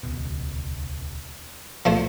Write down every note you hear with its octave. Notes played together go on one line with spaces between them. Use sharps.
D#1 C#2 B2
C#2 A#2 F3 A3 A#3 C5